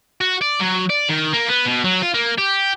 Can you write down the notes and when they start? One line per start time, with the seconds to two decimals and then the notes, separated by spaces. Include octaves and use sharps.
0.21 F#4
0.42 D5
0.60 F#3
0.90 D5
1.09 D#3
1.33 A#3
1.48 B3
1.65 B2
1.84 F#3
2.03 F4
2.14 A#3
2.38 G4